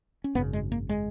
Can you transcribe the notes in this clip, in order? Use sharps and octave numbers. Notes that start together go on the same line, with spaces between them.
C#4
G#1 F#2 C#3 B3
G#3
A#3
G#3